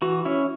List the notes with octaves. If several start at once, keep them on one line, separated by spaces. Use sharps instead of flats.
E3 F#4
C#4 E4